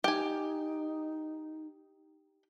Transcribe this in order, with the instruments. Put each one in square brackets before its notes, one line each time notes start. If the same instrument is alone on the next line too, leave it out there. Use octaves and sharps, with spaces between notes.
[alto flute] D#4 [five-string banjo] G4 G#5